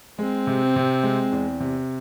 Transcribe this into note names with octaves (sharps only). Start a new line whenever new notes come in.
G#3 C4
C3
C3
G#3
E2
C3